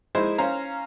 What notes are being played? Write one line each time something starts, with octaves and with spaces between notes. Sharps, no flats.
G#3 D#4 E4 C5
C#4 C5 F5 A#5